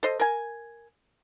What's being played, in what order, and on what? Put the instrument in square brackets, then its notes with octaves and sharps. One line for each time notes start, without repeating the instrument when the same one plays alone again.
[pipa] A4 C5 D#5
A#4 G#5